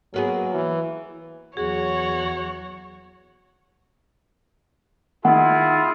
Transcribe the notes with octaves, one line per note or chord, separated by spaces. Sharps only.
F#3 A#3 B3 G#4
E3
E2 F#3 F#4 G#4 C#5
D#3 E4 F4 G#4 F#5